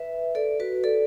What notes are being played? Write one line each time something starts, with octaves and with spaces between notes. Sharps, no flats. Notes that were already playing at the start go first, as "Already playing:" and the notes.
Already playing: B4 E5
A4 D5
F#4 B4
A4 D5